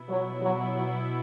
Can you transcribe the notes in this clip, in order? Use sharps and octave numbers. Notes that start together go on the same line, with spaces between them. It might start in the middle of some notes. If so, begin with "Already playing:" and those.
Already playing: B2 B3 E4
F#3
F#3
F#3